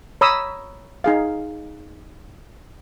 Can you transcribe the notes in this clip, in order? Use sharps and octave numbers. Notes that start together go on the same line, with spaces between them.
C#5 A#5 B5 D#6 E6
D#4 G#4 F5